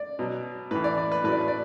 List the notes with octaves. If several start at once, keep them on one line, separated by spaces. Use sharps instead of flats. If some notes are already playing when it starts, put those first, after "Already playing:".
Already playing: D5
B2 F#3
A2 E3 B4
D5
D5
B4
A2 F#3 B4
D5
B4
D5